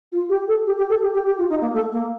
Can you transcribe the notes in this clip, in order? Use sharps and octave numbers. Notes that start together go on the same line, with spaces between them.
F4
G4
A4
G4
G4
A4
G4
G4
G4
F4
D#4
A#3
A3
A#3